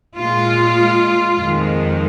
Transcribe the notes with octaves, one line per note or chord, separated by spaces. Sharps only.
A#2 G#3 F4
F2 D#3 G#3